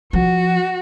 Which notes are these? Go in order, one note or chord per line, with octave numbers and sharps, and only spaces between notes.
F3 F#4